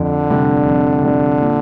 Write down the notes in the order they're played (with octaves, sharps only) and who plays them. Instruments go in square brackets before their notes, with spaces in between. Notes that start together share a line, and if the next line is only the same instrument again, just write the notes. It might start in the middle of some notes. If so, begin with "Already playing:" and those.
Already playing: [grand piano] F2 [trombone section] D3
[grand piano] C3 G3 D4
F2
C3 G3 D4
A#2